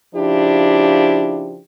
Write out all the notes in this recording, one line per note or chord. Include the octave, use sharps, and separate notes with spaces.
C#3 F3 D4 E4 G4